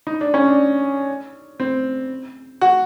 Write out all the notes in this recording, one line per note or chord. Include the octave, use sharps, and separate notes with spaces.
D#4
D4
C#4
D4
C4
F#4